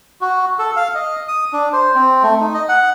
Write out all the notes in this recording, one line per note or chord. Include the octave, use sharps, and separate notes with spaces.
F#4
A4
F5
D#5
D#6
D4
C5
C4
A3
D#4
D#5
F#5